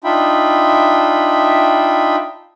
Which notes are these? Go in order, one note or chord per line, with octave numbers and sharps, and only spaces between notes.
D4 D#4 F4 E5 G5 B5